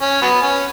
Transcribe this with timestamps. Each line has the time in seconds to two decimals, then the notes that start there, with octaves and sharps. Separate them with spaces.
0.02 C#4
0.22 F#3 B3
0.42 C#4